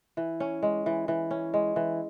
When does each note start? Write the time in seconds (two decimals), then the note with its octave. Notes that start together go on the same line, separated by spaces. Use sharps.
0.17 E3
0.40 C#4
0.62 G#3
0.86 E3
1.08 E3
1.31 C#4
1.54 G#3
1.76 E3